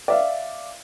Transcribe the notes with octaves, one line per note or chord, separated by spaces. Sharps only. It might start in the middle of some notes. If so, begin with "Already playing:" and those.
D5 E5 F5